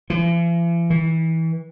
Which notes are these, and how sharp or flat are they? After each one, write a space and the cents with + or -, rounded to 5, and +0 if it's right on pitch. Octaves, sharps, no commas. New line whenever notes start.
E3 +45
E3 -25